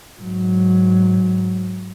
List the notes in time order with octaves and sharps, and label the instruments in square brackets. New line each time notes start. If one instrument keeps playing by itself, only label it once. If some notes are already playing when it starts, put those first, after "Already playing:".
[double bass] G#2 F#3